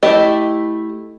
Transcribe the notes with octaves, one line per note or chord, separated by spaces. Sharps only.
A3 E4 G4 D#5